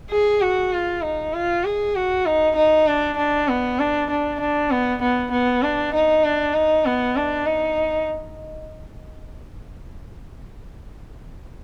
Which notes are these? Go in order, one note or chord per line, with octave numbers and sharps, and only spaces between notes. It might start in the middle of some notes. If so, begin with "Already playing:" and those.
G#4
F#4
F4
D#4
F4
G#4
F#4
D#4
D#4
D4
D4
B3
D4
D4
D4
B3
B3
B3
D4
D#4
D4
D#4
B3
D4
D#4